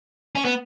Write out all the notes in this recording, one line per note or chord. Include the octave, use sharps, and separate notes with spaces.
C#4
B3